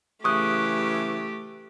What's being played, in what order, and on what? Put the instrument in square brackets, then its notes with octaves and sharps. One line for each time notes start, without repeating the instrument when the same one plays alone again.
[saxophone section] C#3 E3 [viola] A3 G4 [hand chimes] C#6 D#6 F#6